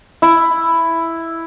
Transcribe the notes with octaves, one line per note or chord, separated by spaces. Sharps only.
E4